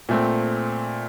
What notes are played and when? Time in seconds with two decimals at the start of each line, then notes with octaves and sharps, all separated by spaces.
0.09 A#2 A3 C4